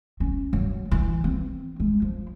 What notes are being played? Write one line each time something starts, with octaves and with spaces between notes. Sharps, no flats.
C#4
F#3
E3
C4
G#3
F3